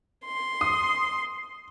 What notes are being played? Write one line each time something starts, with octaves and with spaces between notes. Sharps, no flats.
C6
D#6